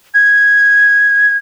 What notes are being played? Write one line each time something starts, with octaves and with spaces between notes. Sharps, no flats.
G#6